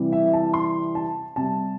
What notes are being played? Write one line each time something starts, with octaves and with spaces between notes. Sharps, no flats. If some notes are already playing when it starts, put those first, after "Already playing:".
Already playing: C3 E3 G3
E5
A5
C6
A5
C3 G3 A5